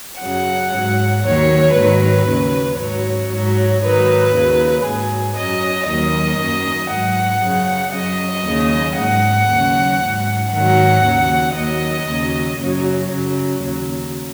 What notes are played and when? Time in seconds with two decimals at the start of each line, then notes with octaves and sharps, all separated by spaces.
0.21 F#2 C#3 F#3 F#5
0.73 G#2 F#3
1.25 D#2 D#3 F#3 C#5
1.76 G#2 D#3 F#3 B4
2.28 D#2 C#3 F#3
2.79 G#2 F#3 C#5
3.31 G#2 F#3
3.82 G#2 D#3 F#3 B4
4.34 D#2 C#3 F#3
4.85 G#2 F#3 G#4
5.37 F#2 F#3 D#5
5.89 D#2 D#3 F#3 D#5
6.40 F#2 D#3 F#3
6.92 G#2 F#3 F#5
7.43 F#2 C#3 F#3
7.95 F#2 F#3 D#5
8.47 D#2 C#3 F#3
8.98 G#2 F#3 F#5
9.50 D#2 C#3 F#3
10.02 G#2 F#3
10.53 G#2 D#3 F#3 F#5
11.05 D#2 C#3 F#3
11.56 D#2 D#3 F#3 D#5
12.08 D#2 C#3 F#3
12.59 F#2 C#3 F#3
13.11 F#2 C#3 F#3
13.62 D#2 C#3 F#3